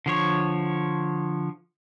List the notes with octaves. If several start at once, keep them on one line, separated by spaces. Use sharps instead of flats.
D3 F3 C#5